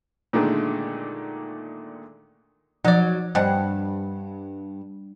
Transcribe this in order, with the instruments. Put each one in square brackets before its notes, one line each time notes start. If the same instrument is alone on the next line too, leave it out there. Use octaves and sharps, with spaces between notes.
[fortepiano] A#2 D3 D#3 G#3 A3
[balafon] F3 [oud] F#3 [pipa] D#4 D5
[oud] G2 [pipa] G3 C4 F#5 [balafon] C5 D#5 G#5